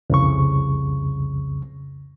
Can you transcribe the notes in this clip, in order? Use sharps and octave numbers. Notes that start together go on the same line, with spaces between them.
C2 F2 C#3 C#6